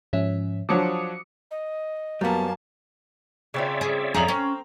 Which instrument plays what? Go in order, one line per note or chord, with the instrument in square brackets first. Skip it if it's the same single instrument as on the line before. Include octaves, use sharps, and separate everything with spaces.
[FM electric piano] G#2 F3 C#4 [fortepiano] E5
[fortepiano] F3 F#3 D4 [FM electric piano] D6 D#6 C#7
[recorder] D#5
[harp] F#2 [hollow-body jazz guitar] G3 B3 [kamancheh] A#3 A5
[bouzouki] C#3 C4 F4 [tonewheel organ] C#5 D5 E5
[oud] G#4
[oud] F2 D#4 G#4 [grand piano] A#5 F7 F#7
[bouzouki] C4 [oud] C#4